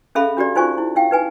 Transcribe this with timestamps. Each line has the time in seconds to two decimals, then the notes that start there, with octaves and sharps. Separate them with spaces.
0.15 C#4 G#4 A4 E5 F5 B5
0.37 D4 F#4 G4 D5
0.55 D#4 F4 C5 G#5 C#6
0.78 E4
0.96 E4 F5 G5
1.11 D#4 B4 G#5